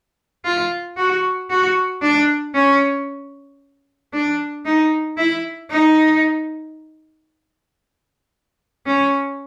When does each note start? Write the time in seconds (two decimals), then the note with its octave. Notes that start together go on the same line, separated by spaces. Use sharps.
0.45 F4
0.97 F#4
1.50 F#4
2.02 D4
2.54 C#4
4.13 D4
4.65 D#4
5.17 E4
5.70 D#4
8.86 C#4